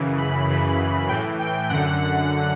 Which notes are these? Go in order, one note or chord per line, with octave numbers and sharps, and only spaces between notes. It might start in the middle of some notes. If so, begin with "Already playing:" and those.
Already playing: F#2 C#3 E3
B5
F#2 C#3 E3 B5
A2 E3 G5
G5
F#2 D3 F#5